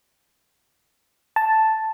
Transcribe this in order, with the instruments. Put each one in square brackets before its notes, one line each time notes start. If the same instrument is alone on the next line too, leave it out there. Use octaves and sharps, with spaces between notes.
[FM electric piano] A5